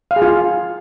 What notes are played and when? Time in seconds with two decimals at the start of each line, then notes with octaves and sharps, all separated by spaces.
0.11 F5
0.16 G#4
0.22 F4